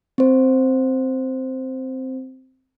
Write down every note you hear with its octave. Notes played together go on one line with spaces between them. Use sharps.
C4 C5